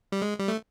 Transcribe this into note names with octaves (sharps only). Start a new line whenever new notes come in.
G3
G#3
G3
A3